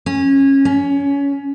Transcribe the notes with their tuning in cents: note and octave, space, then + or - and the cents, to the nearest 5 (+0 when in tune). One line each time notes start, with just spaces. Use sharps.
C#4 -20
C#4 +20